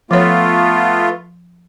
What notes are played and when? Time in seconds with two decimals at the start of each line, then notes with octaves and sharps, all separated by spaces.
0.11 F3 A3 B3 F4 C#5